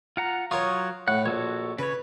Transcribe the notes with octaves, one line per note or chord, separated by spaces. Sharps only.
F4 F#5 A#5
F#3 F4 A#4 C#5 C#6 D#6
A2 F#5
A#1 F#4 A4 C#5
C#3 B4 C#5